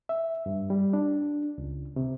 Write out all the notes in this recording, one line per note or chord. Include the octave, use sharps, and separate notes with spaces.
E5
G2
G3
D4
C#2
C3